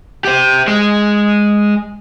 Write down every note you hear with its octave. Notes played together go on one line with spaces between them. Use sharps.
G4 C5
G#3